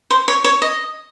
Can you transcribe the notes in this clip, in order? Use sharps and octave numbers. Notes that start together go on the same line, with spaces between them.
C5
C#5
C#5
D#5